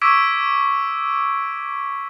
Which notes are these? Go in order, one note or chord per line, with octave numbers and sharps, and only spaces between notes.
C#6 D6 E6 G#6 B6 D7